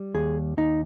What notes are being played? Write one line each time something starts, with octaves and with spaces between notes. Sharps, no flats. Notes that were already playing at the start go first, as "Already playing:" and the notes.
Already playing: G3
D#2 G#4
D#2 D#4